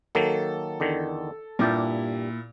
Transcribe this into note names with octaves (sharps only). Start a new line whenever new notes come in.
D#3 F#3 A#3 A4
E2 D3 D#3
G2 A#2 E4 G4 A5